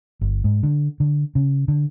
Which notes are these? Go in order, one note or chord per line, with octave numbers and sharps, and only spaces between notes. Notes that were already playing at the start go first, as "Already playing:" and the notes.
G1
G#2
D3
D3
C#3
D3